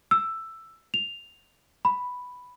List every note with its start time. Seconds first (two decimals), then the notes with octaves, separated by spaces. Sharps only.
0.11 E6
0.94 F7
1.85 B5